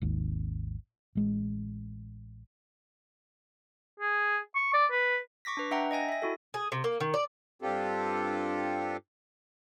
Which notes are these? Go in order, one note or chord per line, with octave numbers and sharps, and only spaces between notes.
G#1 D#2
A1 G#3
G#4
C#6
D5
B4
C#6 D6 A#6 B6
D4 B4
D4 E5 F#5 G5 A#5
D#5 G5 G#5 A#6
E5 A#6
E4 F#4 A4
G#4
C3
A#3
D#3
D5
G2 C4 D4 F4 G4 A4